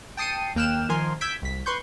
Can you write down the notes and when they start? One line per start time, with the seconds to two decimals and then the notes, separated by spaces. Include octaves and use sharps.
0.17 G5 A5 D#6 C7 C#7 D#7
0.55 D#2 A#3 G5 F6 F#6 E7
0.89 D#3 F3 A#4 G#5 C6
1.21 E6 G6 G#6 B6 D7
1.42 C2 B6
1.66 B4 C6 C#6 G6